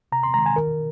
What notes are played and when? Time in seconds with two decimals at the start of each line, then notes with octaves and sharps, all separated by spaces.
0.12 C3 A#5
0.23 C6
0.34 D#3 G#3 A#5
0.46 G#5
0.56 D#3 A#4